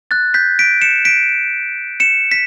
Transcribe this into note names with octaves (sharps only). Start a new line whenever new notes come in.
F#6 A6
G6 B6
B6 D7
C#7 E7
B6 D7
C#7 E7
B6